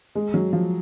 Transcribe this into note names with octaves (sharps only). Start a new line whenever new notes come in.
G#3
F#3
F3